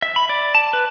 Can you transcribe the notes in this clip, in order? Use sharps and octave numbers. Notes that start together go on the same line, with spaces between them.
E5
B5
D5
A5
B4